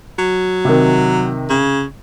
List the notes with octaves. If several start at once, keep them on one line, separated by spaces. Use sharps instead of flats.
F#3
C3 D#3
C#3